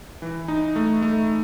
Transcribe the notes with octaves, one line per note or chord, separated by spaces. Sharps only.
E3
D#4
A3
A3